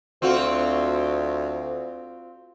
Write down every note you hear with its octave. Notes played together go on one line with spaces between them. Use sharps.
D2 C4 F4 F#4